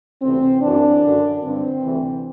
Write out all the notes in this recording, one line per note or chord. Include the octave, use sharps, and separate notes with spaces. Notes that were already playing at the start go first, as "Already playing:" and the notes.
D2 C3 E3 C4
F#2 E3 D4
F#2 D3
G2 D3 C4
D2 C3 E3